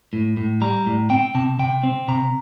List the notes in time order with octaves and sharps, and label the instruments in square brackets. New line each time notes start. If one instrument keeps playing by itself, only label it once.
[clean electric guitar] A2
A2
G3 A#5
A2
C4 G5
C3 A5
C3 G5
C4
C3 A#5